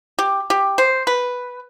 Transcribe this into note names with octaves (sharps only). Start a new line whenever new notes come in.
G4
G4
C5
B4